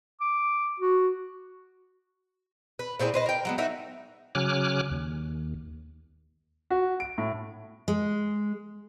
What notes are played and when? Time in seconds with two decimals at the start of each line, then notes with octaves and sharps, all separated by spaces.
0.21 D6
0.80 F#4
2.79 B4
2.99 A#2 C4 E4 G#4
3.14 B4 C5 D#5
3.26 A#4 G5
3.45 F#3 G#3 B3
3.58 D#4 F#4 A#4 E5
4.35 C#3 F#3 G#5 D6 F6 F#6
4.91 D#2
6.70 F#4
7.00 D7
7.18 A2
7.88 G#3